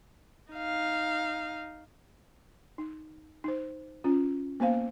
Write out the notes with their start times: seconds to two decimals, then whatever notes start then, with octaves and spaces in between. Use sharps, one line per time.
0.52 D#4 F5
2.78 D#4
3.44 D#4 C5
4.04 C#4 F4
4.60 A#3 B3 C5 F5